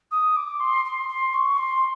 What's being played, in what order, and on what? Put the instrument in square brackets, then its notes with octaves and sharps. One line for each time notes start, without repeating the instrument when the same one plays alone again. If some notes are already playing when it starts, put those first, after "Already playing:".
[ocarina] D#6
D6
C6
C6
C6
C#6
C6